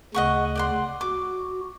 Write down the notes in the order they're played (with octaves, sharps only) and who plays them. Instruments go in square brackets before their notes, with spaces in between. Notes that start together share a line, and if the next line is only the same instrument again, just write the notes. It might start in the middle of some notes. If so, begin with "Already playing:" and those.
[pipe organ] D2 C#3 [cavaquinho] D#5 F#5 C#6
[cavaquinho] D5 F#5 C6
[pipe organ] F#4 [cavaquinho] D6